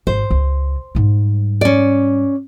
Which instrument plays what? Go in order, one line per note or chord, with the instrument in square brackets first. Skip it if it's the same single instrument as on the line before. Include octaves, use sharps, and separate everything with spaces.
[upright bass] G#1 [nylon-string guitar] C5
[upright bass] C#2
G#2 G3
[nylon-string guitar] C#4 D5